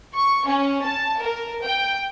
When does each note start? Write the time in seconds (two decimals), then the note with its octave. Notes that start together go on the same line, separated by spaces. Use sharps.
0.16 C#6
0.48 C#4
0.86 A5
1.21 A#4
1.63 G5